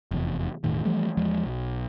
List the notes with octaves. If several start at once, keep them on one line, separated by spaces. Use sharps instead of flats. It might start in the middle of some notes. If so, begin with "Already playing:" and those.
F1 E2
E1 A2 D#3
E3 F3 G3 A3
E2 F3 G#3
B1